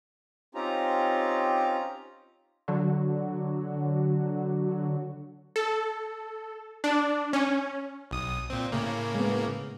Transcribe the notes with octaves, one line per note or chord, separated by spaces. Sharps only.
C4 C#4 D#4 F4 G4 A#5
D3 F#3 F#4
A4
D4
C#4
B1 D#6
A#2 C4
A2 C#3 A#3
G#3 B3